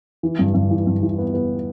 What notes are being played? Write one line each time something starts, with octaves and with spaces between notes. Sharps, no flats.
E3
G2
G2
E3
G2
E3
B3
B3